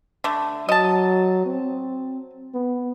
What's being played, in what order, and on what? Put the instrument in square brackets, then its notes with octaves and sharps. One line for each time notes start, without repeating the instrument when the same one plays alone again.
[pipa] D3 A3
[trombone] F#3 [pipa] D#5 A5
[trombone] C4
B3